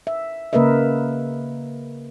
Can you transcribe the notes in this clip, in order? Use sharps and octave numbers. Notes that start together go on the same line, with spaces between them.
E5
C#3 A#3 A#4 B4 D#5 E5